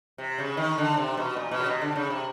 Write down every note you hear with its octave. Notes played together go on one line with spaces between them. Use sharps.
C3
C#3
D#3
D3
C3
B2
A#2
B2
C#3
C3
D3
C#3
C3